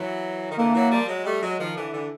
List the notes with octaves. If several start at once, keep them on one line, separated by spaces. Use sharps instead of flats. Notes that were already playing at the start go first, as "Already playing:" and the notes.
Already playing: E3 F#3
D#3
D3 E3 A#3
E3 F#3
F3 G3
F#3 G#3
G3 A3
F#3 G#3
D#3 F3
D3 E3
D3 E3